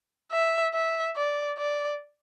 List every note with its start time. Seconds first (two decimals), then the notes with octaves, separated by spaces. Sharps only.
0.32 E5
0.74 E5
1.16 D5
1.58 D5